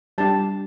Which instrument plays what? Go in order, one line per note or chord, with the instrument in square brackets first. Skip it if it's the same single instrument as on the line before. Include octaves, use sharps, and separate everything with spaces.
[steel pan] G3 D4 G4 A5